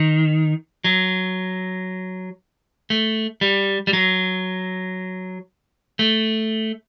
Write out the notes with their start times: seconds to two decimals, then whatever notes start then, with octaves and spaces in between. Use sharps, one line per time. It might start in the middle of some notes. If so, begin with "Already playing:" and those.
Already playing: D#3
0.84 F#3
2.90 A3
3.41 G3
3.87 G3
3.93 F#3
5.99 A3